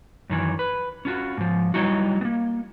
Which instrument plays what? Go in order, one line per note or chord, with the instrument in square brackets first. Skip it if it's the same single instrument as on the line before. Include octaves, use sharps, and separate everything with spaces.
[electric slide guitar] F#2 D#3 E3
B4
C#4 F4 F#4
G#2 F3
F#3 G3 D#4 E4 F#4
A#3 B3